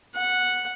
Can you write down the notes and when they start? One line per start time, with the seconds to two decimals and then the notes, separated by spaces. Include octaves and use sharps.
0.15 F#5